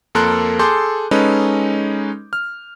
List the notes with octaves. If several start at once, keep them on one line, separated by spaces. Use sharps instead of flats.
F2 A#3 A4 A#4 C6 F#6
G#4 A4 C6 D6 G6
G#3 C#4 D#4 A4 B4
F6